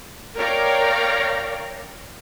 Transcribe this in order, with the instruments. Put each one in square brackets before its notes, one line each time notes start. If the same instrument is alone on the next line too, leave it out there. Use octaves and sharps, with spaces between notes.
[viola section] A#4 C#5 D5 F5 G5 A#5